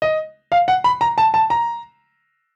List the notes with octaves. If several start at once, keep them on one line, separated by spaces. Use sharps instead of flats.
D#5
F5
F#5
B5
A#5
A5
A5
A#5